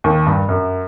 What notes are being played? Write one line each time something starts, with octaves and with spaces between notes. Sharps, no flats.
D#2
G2
F#2